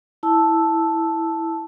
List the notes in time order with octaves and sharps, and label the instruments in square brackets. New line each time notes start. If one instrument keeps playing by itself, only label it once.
[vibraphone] E4 A5 E6